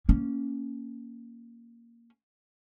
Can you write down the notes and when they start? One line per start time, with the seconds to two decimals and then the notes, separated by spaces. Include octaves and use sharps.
0.09 A#3 C#4